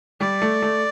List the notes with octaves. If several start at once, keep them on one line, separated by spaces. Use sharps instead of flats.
G3 D5
A3
A3